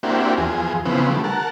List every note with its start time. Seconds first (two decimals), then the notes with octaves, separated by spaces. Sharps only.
0.03 A#3 C4 D4 E4 F#4 G4
0.38 E2 F3 G#4
0.85 C#3 E3 F3 B3 C4
1.10 D3 G3 A3
1.24 A#4 F#5 A5